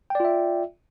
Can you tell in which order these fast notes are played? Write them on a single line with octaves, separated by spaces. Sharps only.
G5 D5 F4 E5